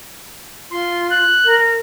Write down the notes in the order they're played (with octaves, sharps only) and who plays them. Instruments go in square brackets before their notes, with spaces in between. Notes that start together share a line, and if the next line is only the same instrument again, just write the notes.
[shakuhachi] F4 [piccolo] C6
[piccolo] F#6
[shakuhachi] A#4